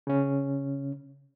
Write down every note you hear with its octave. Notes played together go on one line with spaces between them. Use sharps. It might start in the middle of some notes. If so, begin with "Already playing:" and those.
C#3 C#4